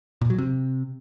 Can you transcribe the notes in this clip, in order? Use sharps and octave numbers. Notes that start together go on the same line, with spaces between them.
A#2
F#3
C3